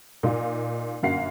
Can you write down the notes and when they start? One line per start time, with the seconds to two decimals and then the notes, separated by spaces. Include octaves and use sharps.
0.23 A#2 D#4 F4
1.03 G1 F#2 A#3 F5 F#5 C7